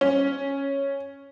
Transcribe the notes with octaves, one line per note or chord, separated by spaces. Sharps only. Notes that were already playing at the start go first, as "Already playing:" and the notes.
C#4